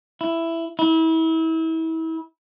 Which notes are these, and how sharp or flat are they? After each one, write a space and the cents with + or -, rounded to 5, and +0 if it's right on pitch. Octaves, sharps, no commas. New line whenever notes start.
E4 +10
E4 -30